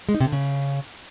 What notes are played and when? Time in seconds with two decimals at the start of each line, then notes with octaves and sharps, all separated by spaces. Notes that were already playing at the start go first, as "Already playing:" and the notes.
0.09 G#3
0.15 D#4
0.20 C3
0.26 D3
0.32 C#3